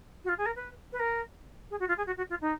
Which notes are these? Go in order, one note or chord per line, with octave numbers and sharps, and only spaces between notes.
F#4
F4
G#4
A#4
B4
B4
A#4
G#4
F#4
F4
G#4
F#4
F#4
F4
D#4